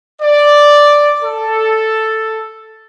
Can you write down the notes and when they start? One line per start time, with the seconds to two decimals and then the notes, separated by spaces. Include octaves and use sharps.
0.22 D5
1.22 A4